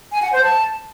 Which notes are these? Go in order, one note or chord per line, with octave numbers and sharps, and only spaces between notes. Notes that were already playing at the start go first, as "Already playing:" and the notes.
G#5
F#5
C5
A5